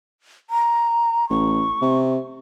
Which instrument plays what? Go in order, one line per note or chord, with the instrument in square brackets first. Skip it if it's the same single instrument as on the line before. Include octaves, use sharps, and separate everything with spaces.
[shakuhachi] A#5
[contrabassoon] A1 [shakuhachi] C#6
[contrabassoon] C3